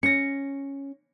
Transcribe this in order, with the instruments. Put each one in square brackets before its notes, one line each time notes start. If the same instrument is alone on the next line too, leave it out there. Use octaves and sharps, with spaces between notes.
[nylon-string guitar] C#4 [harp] A#6 C#7